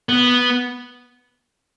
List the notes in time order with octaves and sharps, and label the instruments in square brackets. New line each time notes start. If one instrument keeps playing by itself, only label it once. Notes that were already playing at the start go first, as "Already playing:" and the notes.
[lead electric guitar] B3